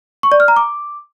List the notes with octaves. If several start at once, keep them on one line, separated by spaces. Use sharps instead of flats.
C#6
D5
F6
A#5
D6